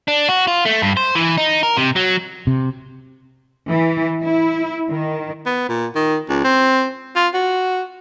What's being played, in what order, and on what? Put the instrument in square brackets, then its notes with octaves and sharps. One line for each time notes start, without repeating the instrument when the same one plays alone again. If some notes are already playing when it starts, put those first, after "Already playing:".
[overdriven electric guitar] D4
F#4
F4
A3
G2
C5
E3
D#4
A#4
C3
F#3
[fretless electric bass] C3
[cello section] E3
E4
D#3
[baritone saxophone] B3
A#2
D#3
C#2
C4
F4
F#4